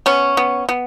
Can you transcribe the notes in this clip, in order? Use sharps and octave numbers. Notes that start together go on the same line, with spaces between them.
B3 C#4
B3
B3